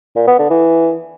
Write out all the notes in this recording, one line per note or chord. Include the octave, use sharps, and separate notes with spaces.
A#2
B3
D3
E3